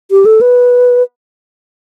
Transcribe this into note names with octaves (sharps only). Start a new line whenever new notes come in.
G4
A4
B4